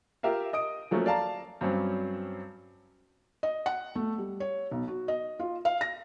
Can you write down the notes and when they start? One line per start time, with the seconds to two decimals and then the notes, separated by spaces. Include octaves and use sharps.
0.23 F4 G4 A#4 E5 F5
0.53 D#5 D#6 D7
0.91 F3 F#3 A3 A#3 C#4
1.06 D5 F5 A5 A#5
1.61 G2 F#3 C4 C#4
3.43 D#5
3.66 F#5
3.95 A3
4.18 G3
4.40 C#5
4.71 B1
4.88 F#4
5.08 D#5
5.39 F4
5.65 F5
5.81 A#6